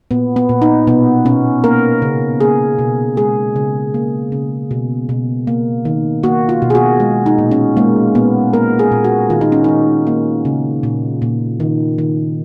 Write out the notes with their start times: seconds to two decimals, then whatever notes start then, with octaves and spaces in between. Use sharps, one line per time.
0.11 A#2 B3
0.36 B3
0.49 A#2
0.62 D#4
0.87 B2 B3
1.25 B2 C#4
1.64 A#3 A#4
2.02 C#3
2.40 A#3 G#4
2.79 B2
3.17 G#3 G#4
3.56 C#3
3.94 A#3
4.32 C#3
4.71 B2
5.09 B2
5.47 A#3
5.85 D#3
6.23 A#3 F#4
6.49 F4
6.62 B2
6.70 G#4
6.75 F#4
7.00 G#3
7.26 D#4
7.38 A#2
7.51 C#4
7.77 G#3 A#3
8.15 A#2 B3
8.53 A#3 A#4
8.79 G#4
8.92 A#2
9.04 F#4
9.30 D#3 F4
9.41 D#4
9.52 C#4
9.64 D#3 D#4
10.07 A#3
10.45 C#3
10.83 A#2
11.22 A#2
11.60 D#3
11.98 D#3